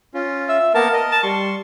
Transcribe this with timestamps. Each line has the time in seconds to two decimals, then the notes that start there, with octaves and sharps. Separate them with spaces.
0.14 C#4 F4
0.49 E5
0.74 A#3 B3 A#4 A5
0.93 A#4 D#5
1.12 A5
1.23 G3 C6 C#6